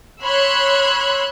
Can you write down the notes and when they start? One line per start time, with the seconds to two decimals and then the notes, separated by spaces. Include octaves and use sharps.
0.24 C#5 B5 C6 E6 F#6 G#6